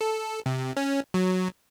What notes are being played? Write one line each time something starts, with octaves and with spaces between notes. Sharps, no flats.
A4
C3
C#4
F#3